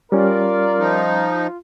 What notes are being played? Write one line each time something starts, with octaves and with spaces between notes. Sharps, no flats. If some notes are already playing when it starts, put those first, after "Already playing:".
G3 C#4 F4 A#4 D5
F3 D#4